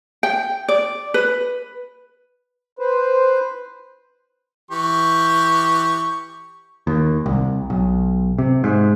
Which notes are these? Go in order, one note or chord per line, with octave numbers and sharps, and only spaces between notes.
G5
D5
B4
B4 C5
E3 G4 C#6
D#2
C2
B1
C3
G#2